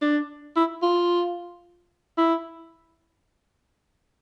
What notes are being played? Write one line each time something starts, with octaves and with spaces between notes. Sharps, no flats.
D4
E4
F4
E4